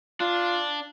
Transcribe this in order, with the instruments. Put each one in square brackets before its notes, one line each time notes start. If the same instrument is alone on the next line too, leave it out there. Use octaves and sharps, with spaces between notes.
[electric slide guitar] D4 [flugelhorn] F4